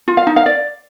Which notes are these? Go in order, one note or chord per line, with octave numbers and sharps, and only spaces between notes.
F4
F5
D#4
F5
D5